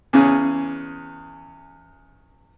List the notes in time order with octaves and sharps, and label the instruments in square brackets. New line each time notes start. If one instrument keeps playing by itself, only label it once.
[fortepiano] E2 C#3 C#4 G#4